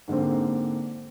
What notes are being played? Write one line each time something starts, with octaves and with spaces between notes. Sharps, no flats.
G#2 D3 A#3 C4